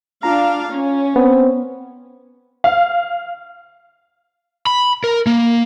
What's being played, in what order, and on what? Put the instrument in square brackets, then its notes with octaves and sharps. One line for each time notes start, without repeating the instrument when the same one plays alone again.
[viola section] D4 F5 [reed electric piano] F4 A#5
[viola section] C#4
[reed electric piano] B3 [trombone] C4
[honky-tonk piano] F5
[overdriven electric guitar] B5
A#4
A#3